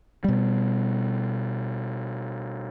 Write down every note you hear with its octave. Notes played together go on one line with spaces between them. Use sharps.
B2 G3